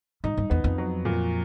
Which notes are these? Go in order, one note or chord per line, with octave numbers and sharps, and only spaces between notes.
G#2 D#4
G2
E2 B3
F2
F#3
A#2